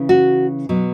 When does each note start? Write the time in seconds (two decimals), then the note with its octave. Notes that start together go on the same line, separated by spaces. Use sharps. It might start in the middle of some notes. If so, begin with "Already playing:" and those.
Already playing: C#3 E3
0.09 F#4
0.69 B2 F#3